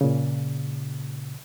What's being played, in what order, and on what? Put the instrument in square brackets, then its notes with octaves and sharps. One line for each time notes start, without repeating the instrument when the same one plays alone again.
[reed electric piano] A#2 C#3